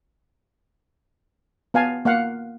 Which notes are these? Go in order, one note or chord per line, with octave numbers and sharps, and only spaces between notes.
B3 F5 G#5 A5
A#3 F5 F#5